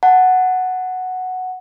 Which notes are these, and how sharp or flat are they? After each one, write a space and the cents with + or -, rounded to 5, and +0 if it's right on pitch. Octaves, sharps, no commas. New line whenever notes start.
F#5 +0 A5 +0